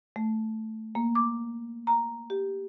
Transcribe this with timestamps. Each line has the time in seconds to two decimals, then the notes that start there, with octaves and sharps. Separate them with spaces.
0.16 A3
0.95 A#3
1.15 D6
1.87 A#5
2.30 G4